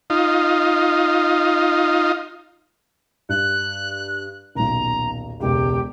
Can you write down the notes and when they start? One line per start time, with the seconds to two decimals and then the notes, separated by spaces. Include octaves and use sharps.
0.10 D#4 F4
3.29 G2 F#6
4.55 D#1 B1 A#5
5.40 E1 C#2 G4